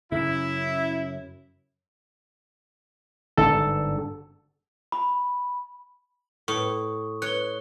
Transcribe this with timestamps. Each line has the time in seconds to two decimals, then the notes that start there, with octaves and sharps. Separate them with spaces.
0.12 F#2 C#3 E4
3.38 G1 G#2 D4 A4
4.92 B5
6.48 A2 C#6 D#6
7.22 C#5 F#6 G7